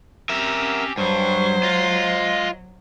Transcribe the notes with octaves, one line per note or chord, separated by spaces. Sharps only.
C4 C#4 G4 A#4 E5
G2 F#3 C5 C#6
G#3 F4 D#5